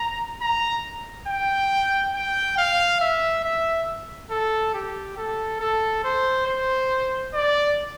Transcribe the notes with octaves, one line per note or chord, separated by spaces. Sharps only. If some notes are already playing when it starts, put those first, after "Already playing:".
Already playing: A#5
A#5
G5
G5
F5
E5
E5
A4
G4
A4
A4
C5
C5
D5